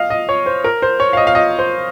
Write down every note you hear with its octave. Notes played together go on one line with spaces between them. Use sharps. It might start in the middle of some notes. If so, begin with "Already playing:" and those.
Already playing: D#5 F5
D#5
C#5
C5
A#4
C5
C#5
F5
D#5
F5
D#5
C5